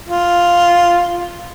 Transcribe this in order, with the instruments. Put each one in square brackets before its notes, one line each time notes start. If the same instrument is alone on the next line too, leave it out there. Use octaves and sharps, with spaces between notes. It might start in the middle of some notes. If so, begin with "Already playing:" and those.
[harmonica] F4